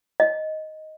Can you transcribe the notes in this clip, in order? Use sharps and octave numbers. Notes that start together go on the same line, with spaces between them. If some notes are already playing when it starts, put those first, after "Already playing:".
D#5